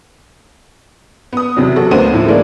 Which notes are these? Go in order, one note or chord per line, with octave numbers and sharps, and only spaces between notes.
B3 D#6
E2 C3 F#3
F#4 A4
D2 A#3 B3 C5 D#7
A2 F3
E3 G#3 A#3 D4